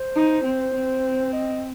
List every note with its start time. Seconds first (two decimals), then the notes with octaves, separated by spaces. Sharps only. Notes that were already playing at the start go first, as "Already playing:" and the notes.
Already playing: C5
0.16 D#4
0.45 C4
0.74 C4
1.33 D#5